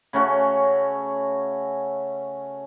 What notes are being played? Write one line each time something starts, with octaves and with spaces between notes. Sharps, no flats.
C#3 A3 C#4 F#4